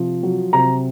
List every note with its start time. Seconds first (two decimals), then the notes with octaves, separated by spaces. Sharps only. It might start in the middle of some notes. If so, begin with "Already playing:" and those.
Already playing: C3 F3
0.23 F#3
0.53 C3 A#5